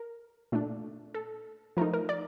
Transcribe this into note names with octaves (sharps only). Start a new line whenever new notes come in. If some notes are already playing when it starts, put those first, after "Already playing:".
Already playing: A#4
A#2 A3 D4
A4
F3 A3 D#4 A#4
A#4
D5